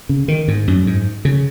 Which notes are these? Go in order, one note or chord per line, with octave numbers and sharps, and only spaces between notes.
C#3
D#3
G#2
F#2
G#2
C#3